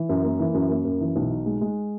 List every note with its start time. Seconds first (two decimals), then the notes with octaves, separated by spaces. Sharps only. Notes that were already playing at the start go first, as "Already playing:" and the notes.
Already playing: E3
0.09 F#2
0.24 A#3
0.39 E3
0.54 F#2
0.69 A#3
0.85 F#2
1.00 E3
1.16 B1
1.30 D#4
1.46 G#3
1.61 G#3